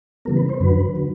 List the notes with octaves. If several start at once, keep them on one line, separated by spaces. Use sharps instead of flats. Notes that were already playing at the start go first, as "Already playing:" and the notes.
C#3 E3 G3 B3 A#4
B4
C5
F#2 D3 F#3 B4
D3 F#3